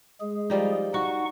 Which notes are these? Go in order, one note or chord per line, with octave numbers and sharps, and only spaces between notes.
G#3 G#4
F3 G3 D#4
D#4 F#4 F#5 C#6